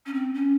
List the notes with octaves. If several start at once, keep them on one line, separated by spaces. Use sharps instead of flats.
C#4
C4
C#4